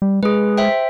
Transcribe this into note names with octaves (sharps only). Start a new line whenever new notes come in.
G3
G#3 G#4 B4
C5 E5 G5